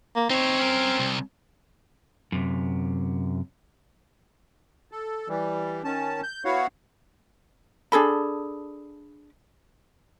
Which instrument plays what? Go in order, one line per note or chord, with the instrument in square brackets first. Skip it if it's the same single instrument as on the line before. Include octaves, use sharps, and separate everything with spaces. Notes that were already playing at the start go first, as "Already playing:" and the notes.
[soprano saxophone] A#3
[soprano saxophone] C4 [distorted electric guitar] D#4 C#5
[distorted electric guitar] C#4 A#4
C2
[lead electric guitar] F#2 C3
[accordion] A4
E3 G3
D#3 C#4 A5
G6
B3 E4 F#4 C#5 F5 F#5
[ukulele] D4 G#4 A4 B5